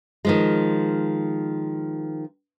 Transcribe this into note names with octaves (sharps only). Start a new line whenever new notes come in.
D#3 F3 G#3